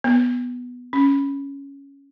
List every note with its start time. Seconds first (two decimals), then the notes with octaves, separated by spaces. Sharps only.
0.04 B3
0.93 C#4